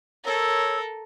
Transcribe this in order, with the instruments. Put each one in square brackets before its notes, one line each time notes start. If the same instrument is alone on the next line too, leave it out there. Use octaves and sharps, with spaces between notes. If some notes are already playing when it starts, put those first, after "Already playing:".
[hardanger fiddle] A4 A#4 [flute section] C#5 E6